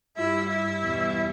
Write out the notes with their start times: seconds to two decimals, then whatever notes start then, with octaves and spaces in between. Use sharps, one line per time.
0.17 G2 G3 E4 E5
0.49 E4 E5
0.81 E2 B2 G3